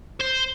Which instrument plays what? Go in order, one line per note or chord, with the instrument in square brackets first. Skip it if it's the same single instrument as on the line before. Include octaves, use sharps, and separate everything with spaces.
[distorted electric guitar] C5